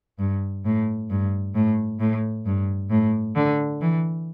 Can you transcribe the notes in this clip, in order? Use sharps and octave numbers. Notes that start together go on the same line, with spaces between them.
G2
A2
G2
A2
A2
G2
A2
D3
E3